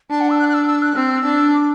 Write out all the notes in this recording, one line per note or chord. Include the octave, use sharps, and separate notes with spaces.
D4 A5
F#5
E6
F#6
F#6
E6
E6
F#6
C4 E6
D4
D6